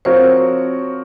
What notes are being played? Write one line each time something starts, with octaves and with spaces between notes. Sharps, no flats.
F3 C4 F#4 A#4 C5 C#5